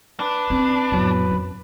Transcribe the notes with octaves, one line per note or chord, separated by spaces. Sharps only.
D4 B4
C4 C#4
F2 A2 F#3 B3
F#2